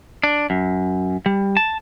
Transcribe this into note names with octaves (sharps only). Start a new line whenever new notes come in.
D4
F#2
G3
A5